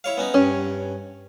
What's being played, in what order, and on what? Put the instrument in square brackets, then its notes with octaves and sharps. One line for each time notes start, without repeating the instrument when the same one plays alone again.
[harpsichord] E4 C#5 F5
B3 C#4 D#4
[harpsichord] G2 [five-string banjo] C#4